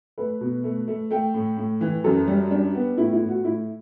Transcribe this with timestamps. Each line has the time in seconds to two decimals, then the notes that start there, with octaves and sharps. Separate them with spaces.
0.18 A3 B4
0.41 B2
0.64 A3
0.88 A3
1.11 A3 G5
1.34 A2
1.57 A2
1.81 E3
2.04 F#2 A4
2.27 G3
2.51 G3 D4
2.75 B3
2.98 A2 E4
3.13 E4
3.21 A2
3.29 F#4
3.44 A2 E4